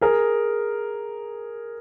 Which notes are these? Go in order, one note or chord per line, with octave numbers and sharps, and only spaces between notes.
G#4 A#4